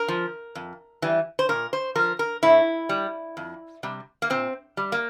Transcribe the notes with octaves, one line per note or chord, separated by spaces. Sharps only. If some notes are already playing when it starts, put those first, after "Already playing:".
Already playing: A#4
F3
F2
E3 G3
C5
A#2 A#4
C5
F3 A#4
A#4
A2 E4
G3
F2
C3 G3
A#3
A#2 C4
G3
A#3